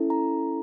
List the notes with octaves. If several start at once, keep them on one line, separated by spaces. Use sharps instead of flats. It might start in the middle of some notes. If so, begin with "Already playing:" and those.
Already playing: C#4 E4 A4
A#5